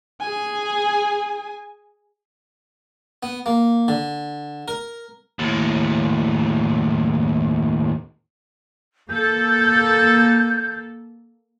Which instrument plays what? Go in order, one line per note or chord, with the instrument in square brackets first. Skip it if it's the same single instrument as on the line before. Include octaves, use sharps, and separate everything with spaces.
[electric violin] G#4 G#5
[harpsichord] B3
A#3
D3
A#4
[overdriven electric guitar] D#2 A2
[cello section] A#3 A4 [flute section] G6